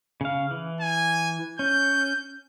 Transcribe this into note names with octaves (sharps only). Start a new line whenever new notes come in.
C#3 F5
E3
G#5
C#4 G6